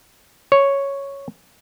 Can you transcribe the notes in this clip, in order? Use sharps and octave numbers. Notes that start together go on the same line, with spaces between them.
C#5